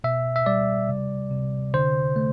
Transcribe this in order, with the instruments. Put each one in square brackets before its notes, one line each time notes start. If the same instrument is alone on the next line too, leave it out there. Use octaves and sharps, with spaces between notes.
[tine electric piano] B2 E5
E5
G3 D5
C3
C3
D3 C5
A3